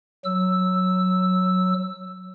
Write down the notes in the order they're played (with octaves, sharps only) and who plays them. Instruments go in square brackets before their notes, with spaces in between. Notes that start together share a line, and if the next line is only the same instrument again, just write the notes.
[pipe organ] F#3 E6